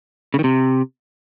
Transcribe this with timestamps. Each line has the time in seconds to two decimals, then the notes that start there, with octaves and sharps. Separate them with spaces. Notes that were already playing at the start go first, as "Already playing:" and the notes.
0.34 C#3
0.39 D#3
0.44 C3